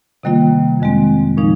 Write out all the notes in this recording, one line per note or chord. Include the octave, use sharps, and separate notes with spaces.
C3 D#3 G3 A#3 F4
F2 D#3 G#3 C4
A#2 F3 G#3 D#4